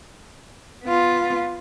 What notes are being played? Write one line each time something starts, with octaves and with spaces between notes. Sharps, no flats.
B3 F4